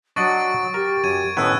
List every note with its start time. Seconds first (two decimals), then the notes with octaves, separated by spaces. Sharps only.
0.16 F#3 D4 D#5 F#5 C#6 A6 D7
0.74 G4 A#4
1.04 F#2 G#6 D7 D#7
1.37 A2 D#3 B3 C#4 E6 F#6 G#6